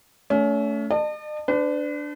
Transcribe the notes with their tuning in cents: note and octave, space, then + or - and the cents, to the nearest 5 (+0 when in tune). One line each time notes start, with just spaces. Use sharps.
A3 +0 C#4 +35
D#5 -45 A5 +15
D4 +0 B4 +45